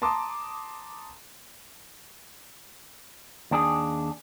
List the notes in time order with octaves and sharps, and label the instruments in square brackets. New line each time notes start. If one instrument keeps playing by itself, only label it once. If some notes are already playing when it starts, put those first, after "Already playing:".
[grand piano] A5 A#5 C6 D6 D#6
[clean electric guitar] D#2 D4 G#4